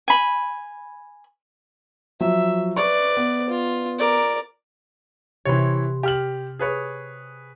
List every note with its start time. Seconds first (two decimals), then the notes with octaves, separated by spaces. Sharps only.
0.08 G#5 B5
2.21 F3 F#3 E5
2.76 B4 D5 C#6
3.17 B3
3.49 F4
3.99 A#4 D5
5.45 C3 E3 C#5 B5 C6
6.03 G4 F6 F#7
6.59 G#4 B4 C#5